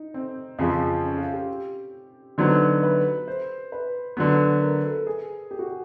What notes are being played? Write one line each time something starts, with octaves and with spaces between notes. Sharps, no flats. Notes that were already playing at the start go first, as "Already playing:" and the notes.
Already playing: D#4
C4
F2 C#3 F3 C4
C#4
F4
G4
D3 F#3 B3 D#4 C5
B4
C5
B4
D3 F#3 B3
A#4
A4
G#4
G4
F#4
G4